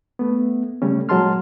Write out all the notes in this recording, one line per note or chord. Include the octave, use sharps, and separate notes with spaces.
A3 B3
C#3 G3 A3 C#4
A#2 F#3 G#3 A5 C6 F6